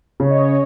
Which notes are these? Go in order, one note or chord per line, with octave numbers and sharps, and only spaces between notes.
C#3 C#5
D#5
C#4 C#5